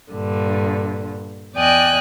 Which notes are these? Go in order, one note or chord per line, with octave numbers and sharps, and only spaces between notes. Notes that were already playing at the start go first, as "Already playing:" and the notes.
G2 A#2 D3
E2 D5 D#5 G5 G#5 F#6